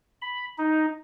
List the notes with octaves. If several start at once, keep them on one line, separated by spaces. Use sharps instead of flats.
B5
D#4